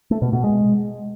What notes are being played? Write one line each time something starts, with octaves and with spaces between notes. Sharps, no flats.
A3
B2
B2
G#3